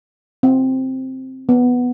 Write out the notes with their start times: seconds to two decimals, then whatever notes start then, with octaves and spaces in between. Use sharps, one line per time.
0.43 C4
1.49 B3